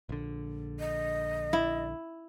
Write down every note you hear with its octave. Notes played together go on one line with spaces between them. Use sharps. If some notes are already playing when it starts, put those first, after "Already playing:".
A#1 D3
D#5
E4